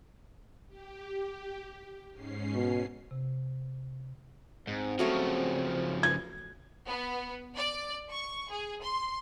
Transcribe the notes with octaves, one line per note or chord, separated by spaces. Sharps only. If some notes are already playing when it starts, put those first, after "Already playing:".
G4
G#2 C#4 C7
B2
C3
G#2 C4
C#3 F3 F#3 A3 F#4
G#6
B3
D5
C#6
G#4
C6